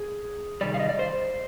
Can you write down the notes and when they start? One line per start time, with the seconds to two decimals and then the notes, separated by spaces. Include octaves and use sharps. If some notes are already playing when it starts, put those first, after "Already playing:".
Already playing: G#4
0.61 C3 D#3 G3 D5
0.74 F5
0.79 D#5
0.89 D5
0.99 C5